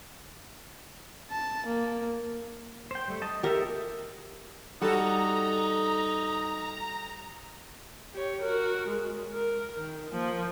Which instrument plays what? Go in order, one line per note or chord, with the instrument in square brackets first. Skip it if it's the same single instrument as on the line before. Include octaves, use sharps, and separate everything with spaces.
[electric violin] A5
A#3
[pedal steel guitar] C5 G5
G3 A3
D#5 A5
[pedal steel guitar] D#4 A4 E5 [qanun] G4 A#4
[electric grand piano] G3 [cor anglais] D#4 [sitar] F#4 A4 [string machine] A#5
[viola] G4 C#5
F#4 A#4
G#3
A#4
D#3
F3 A#3